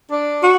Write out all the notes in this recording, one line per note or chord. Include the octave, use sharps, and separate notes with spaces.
D4
F#4